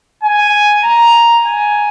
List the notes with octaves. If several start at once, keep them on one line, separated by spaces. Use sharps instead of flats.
G#5
A#5
G#5